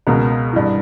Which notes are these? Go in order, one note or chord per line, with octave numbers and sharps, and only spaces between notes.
C#2 B2 A#4
G2 E3